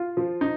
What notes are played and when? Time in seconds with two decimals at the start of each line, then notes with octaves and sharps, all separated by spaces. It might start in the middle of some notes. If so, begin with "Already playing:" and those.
Already playing: F4
0.17 F3
0.41 D#4